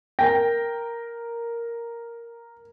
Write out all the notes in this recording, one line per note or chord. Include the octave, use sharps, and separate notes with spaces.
A#4 G5 A#6